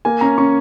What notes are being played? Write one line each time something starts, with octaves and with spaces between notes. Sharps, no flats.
A#3 G#5
C#4 A#5
C#4 C#6